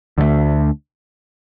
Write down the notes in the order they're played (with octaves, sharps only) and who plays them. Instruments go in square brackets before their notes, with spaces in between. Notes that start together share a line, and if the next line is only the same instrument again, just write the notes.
[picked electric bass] D2 D3 F3 A3